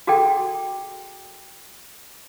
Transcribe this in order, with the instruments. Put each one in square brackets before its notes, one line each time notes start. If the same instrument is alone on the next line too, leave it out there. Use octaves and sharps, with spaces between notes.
[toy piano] F#4 G#4 A4 G5